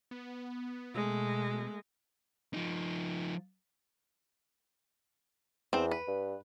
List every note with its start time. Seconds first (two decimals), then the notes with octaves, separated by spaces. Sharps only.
0.11 B3
0.95 B2 G#3 A3
2.54 F3 D#4
5.73 E2 C4 C5
5.91 B4
6.08 G2